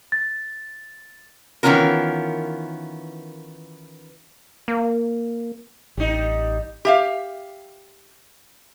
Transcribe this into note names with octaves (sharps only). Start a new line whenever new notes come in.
A6
D#3 E3 B3 C#4 F4 A#4
A#3
A1 G3 D#4
G4 E5 F5